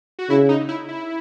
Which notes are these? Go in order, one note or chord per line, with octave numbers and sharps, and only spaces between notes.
F#4
C#3 E4
D#4
E4
E4